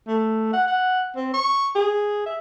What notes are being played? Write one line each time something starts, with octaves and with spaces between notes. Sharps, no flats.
A3
F#5
F#5
C4
C#6
G#4
E5